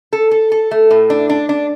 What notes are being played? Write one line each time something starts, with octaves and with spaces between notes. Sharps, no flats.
A4
A4
A4
A3
A2
D4
D4
D4